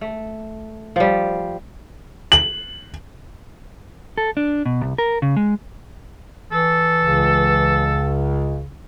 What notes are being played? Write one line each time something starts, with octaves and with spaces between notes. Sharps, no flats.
A3
F3 G3
F#7
A4
D4
B2
C2
A#4
C#3
G#3
E3 A4
C#2 C#3